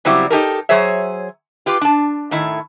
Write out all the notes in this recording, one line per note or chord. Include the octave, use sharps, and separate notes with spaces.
C#3 F#3 G3 C4 E4 G4
D#4 G4 A4 A#4
F#3 G#4 C5 C#5 E5
F4 G4 B4
D4 A5
A2 D#3 E4